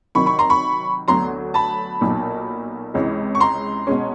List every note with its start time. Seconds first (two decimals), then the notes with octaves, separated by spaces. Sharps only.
0.15 C3 D#3 F#3 B5 C#6
0.26 B5 C#6
0.39 A#5 C6
0.50 B5 C#6
1.08 D2 D3 F#3 B3 A#5 C6
1.54 A5 B5
2.01 B1 A#2 F#3 A#3 D#4
2.94 C#2 C3 E3 G#3 C#4
3.35 C#6
3.40 A#5 C6
3.87 B2 G#3 C#4